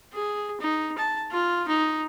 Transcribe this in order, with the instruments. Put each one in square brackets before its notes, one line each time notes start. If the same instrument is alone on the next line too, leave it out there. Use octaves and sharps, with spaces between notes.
[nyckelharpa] G#4
D#4
A5
F4
D#4